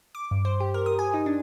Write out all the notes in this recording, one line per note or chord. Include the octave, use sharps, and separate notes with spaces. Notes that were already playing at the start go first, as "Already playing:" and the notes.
D6
G2
C5
G4
A#4
D#6
G#5
D#4
D4